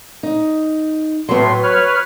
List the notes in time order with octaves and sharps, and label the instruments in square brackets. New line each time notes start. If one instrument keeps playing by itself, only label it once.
[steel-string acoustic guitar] D#4
[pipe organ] A2 C6 [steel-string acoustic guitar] F#3 B3
[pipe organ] B4 C#5 F6